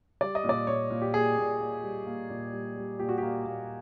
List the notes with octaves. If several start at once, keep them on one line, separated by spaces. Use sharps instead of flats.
G3 D5
D#5
A#2
D5
A#2 C#5
A#2
G4
A#3 G#4
A#2
A#3
G3
A#3
A#2
G3
G3
A#2 G4
F#4
G4
A#3
A#3